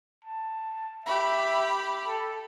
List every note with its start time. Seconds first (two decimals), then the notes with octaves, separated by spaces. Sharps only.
0.25 A5
1.06 G4 E5 B5
2.07 A4